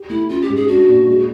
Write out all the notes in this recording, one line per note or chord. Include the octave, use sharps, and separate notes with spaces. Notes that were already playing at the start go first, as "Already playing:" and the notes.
Already playing: G4
A3 E4
C#4 F4
G4
G#2
G#4
D4 F#4
A#2
G#3